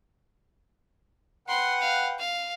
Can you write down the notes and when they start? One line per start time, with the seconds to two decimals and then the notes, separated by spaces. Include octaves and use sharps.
1.48 B4 F#5 G5 C6
1.81 F5
2.18 F5